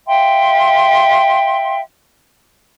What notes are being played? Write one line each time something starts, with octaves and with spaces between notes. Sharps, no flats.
E5 F5 G5 C6